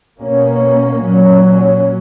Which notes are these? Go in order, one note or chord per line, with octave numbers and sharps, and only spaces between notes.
B2 A#3 C#4
A#2 F#3 C#4